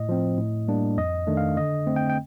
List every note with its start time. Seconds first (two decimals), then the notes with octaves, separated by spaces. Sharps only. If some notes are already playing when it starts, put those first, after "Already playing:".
Already playing: A2 D#5
0.09 F3 C4
0.38 A2
0.68 G3 A#3 D4
0.98 F2 D#5
1.27 D#3 A3 D4
1.37 F5
1.57 D3 D#5
1.87 A3 C4
1.96 G5
2.10 G5